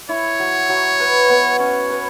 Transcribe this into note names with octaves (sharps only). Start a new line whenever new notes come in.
E4 C#5
F#3
F#3
B4
B3
C#4 C#5
B4